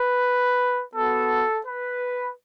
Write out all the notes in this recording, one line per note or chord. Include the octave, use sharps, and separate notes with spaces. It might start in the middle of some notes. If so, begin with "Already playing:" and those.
Already playing: B4
B3 F#4 A4
B4